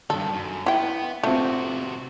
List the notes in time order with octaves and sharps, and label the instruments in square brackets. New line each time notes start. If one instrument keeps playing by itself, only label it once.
[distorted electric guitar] G2 D#3 [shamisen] A4
[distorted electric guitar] F#2
[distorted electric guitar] B3 [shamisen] E4 G5
[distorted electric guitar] C3 F#4 [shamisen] A3 [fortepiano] C4 F4